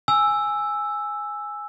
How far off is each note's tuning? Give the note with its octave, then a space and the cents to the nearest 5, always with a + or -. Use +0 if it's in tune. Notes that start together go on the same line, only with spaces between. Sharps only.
G#5 +0 E6 +0